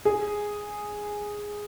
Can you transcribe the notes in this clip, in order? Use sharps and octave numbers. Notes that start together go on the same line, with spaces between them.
G#4